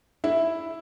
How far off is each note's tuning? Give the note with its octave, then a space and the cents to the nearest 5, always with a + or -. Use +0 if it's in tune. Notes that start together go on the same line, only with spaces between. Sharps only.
E4 +0 E5 +0